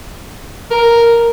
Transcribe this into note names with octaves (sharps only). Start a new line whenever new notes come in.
A#4